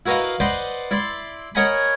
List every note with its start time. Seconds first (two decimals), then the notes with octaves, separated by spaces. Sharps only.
0.06 E4 F#4 A#4 B4 D#5 F5
0.40 B4 C5 D5 D#5 F#5 C6
0.91 E4 D5 E5 C6
1.55 A#4 C#5 D#5 F#5 G#5 B5